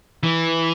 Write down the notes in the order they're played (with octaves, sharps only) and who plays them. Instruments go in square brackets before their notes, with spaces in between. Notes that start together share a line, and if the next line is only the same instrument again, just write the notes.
[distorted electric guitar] E3